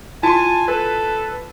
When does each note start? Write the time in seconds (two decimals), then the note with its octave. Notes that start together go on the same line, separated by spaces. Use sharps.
0.23 E4 F4 G#5 A5 C6
0.68 A4 B4